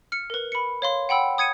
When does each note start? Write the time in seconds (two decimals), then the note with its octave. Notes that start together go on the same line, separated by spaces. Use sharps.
0.12 F6 C#7
0.30 A#4 B4
0.52 B5 C#7
0.82 C#5 F5 C6
1.09 F#5 G5 B5 E6
1.38 D#6 G#6 C#7 D#7